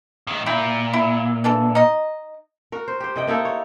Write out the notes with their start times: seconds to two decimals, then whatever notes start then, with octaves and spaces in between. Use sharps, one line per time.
0.27 A2 D#3
0.46 A#2 E4 G5
0.93 E4
1.44 E3 D4 A4
1.75 D#4 D#5
2.72 F#4 A#4
2.88 C5
3.00 G4 C5
3.16 C3 D#5 G5
3.27 A#3 D#4 E4 A4
3.45 C#5